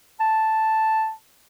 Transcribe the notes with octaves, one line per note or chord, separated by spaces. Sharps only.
A5